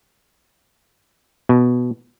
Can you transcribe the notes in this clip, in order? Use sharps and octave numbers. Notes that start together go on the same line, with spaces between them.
B2